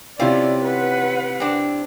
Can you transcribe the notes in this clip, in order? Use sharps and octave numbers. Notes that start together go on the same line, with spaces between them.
C3 C4 C#4 E4 F4 D5
B4 F#5
C4 D4